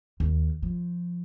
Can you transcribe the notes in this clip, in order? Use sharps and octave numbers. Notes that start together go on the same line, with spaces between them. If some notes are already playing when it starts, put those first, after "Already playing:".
D#2
F3